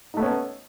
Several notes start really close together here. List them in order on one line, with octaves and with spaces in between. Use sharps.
D#4 A3 B3 C#4